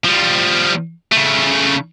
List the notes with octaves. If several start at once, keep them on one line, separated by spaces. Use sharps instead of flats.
F3 G3
C#3 A3